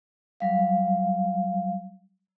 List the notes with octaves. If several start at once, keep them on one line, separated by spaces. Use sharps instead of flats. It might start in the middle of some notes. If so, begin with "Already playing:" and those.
F#3 G3 F5